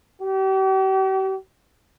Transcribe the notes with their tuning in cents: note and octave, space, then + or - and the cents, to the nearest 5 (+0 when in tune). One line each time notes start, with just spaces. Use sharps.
G4 -40